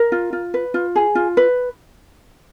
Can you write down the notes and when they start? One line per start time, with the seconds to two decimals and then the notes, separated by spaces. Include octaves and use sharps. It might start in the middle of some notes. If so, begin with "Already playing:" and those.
Already playing: A#4
0.12 F4
0.33 F4
0.54 B4
0.74 F4
0.96 G#4
1.15 F4
1.37 B4